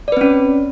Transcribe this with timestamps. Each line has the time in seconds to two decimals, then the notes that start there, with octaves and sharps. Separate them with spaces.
0.08 D5
0.12 B4
0.17 C4
0.21 C#4